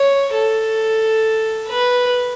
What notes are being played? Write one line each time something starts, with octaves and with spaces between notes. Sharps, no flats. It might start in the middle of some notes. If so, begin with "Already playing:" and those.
Already playing: C#5
A4
B4